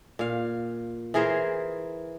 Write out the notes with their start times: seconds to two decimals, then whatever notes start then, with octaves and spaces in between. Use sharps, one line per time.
0.19 A#2 F5
1.14 E3 G#4 A#4 C5